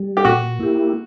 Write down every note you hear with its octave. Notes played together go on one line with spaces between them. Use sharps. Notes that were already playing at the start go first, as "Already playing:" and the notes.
Already playing: G3
G4
A#2 F#4
A#3 E4 G4